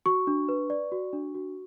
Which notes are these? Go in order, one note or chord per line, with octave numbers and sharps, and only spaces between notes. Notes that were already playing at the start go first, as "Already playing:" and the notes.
F#4 C#6
D4
B4
D5
F#4
D4
F#4